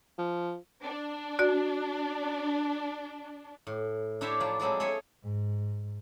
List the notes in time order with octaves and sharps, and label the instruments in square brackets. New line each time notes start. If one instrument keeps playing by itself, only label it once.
[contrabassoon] F3
[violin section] D4
[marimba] F#4 D5
[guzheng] A2
D4 E4 G4 C5 C#5 E5
F3 F#3 F4 D5
F3 F#3 G#3 C4 E4
G#4 A4 C#5 E5
[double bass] G#2